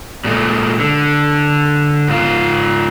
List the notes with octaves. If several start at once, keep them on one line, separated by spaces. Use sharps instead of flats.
A#2 G#3 A3
D3
G#2 F4